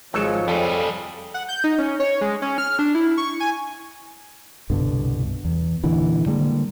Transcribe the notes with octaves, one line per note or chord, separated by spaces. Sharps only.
G#1 F3 F#3 G#3 F4 A4 C#5
F2 G3 G#4 A4
F#5
G6
D#4
C#4
C#5
G#3
C#4
F6
D4
E4
C#6
G#5
C2 G2 B2 D3
E2
A#2 D3 E3
D3 G3 G#3 A#3